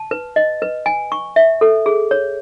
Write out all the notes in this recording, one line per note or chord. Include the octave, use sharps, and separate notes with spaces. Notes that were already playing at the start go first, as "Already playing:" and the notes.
Already playing: A5
B4
D#5
B4
G#5
C#6
E5
A4
G#4
C#5